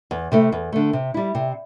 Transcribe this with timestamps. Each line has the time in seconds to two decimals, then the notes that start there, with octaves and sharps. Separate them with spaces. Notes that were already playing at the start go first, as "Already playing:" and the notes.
0.11 E2
0.32 C3 A3 E4
0.52 E2
0.72 D3 A3
0.93 C3
1.14 G3 E4
1.35 C3